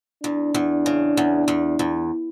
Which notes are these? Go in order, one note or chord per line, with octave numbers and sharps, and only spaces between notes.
E2 D4
E2
C#3
E2
E2
E2